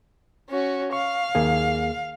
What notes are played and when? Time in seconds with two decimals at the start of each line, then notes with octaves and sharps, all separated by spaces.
0.50 C#4 F#4
0.93 F5 C#6
1.35 D#2 A#3 G#4